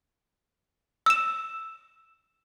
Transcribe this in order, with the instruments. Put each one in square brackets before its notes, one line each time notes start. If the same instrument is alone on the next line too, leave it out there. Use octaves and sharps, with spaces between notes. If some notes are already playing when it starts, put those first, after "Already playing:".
[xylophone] E6 E7